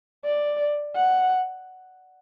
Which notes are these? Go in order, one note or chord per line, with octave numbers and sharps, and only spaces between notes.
D5
F#5